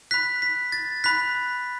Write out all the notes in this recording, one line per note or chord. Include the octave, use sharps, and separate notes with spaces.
B5 F#6 B6
B6
A6
B5 F#6 B6